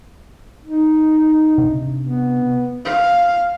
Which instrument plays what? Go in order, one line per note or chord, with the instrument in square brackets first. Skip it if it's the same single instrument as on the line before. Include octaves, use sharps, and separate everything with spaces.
[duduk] D#4
[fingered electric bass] C3 D4
[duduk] B3
[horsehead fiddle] F5